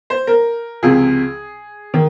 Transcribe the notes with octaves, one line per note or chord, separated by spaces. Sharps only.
C5
A#4
C#2 C3 F3 G#4
D#3